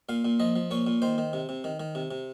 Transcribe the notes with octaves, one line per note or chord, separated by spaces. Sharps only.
A#2 F5
A#2
F3 D#5
F3
A#2 C#5
A#2
D#3 C5
D#3
C3
C3
D#3
D#3
C3
C3